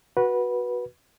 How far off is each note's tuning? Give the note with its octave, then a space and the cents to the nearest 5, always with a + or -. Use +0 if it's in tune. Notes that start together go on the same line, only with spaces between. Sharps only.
F#4 +0 B4 -15